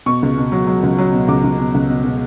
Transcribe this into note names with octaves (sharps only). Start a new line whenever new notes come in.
B2 C#6
C#2
B2
F#3
F#3
C#2
F#3
B2
C#2 D6
C#2
B2
C#2
B2
B2